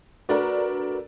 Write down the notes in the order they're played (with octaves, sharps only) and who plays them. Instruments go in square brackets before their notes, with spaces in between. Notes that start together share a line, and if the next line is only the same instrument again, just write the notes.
[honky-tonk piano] A3 D4 A#4 [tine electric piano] F#4 B4 D5